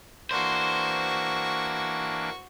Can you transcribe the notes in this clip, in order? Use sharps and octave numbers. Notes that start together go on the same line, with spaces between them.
E3 A#3 D4 F#4 C5 C#6